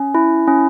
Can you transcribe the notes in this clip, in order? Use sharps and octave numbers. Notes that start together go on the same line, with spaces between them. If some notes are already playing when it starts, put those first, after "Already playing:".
Already playing: C#4
E4
C#4